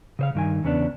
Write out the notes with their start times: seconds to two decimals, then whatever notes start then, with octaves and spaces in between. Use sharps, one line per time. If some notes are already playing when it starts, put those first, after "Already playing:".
0.19 C#3 C5 F5
0.35 G2 D#3 G#5
0.64 E2 C#3 B3 D4